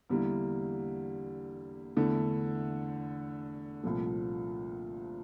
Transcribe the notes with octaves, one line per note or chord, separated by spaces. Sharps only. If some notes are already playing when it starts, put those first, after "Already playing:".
E2 D3 G3 A#3 E4
E2 D3 A3 E4
C2 A#2 F3 A3